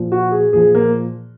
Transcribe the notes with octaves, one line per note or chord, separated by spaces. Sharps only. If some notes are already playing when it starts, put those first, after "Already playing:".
Already playing: A#2 F3
F#4
G#4
A#2 F3 G#4
A#3